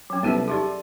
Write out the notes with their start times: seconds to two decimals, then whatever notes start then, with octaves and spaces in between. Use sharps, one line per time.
0.10 F#3 C#4
0.23 C2 B3 D#4 A4 E5 D#7
0.48 D#4 G4 G#4 D5 E5 C6